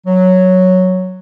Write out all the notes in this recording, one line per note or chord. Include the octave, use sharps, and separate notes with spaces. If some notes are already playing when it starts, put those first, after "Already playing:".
F#3